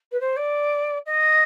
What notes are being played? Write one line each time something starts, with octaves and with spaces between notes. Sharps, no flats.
B4
C5
D5
D#5